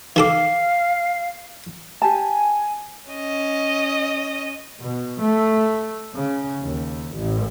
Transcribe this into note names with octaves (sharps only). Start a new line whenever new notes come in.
D#3 A4 F5 D6
G4 G#5 A5
C#4 D#5
B2
A3
C#3
D#2
A1